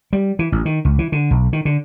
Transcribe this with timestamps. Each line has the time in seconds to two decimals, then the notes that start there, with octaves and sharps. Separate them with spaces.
0.13 G3
0.39 E3
0.52 A1
0.66 D#3
0.85 C#2
0.99 E3
1.12 D3
1.31 B1
1.53 D#3
1.65 D3